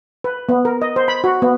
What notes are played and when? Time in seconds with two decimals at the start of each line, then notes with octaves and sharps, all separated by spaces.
0.24 B4
0.49 B3
0.65 A#4
0.82 D#5
0.96 C5
1.08 B5
1.24 F#4
1.42 B3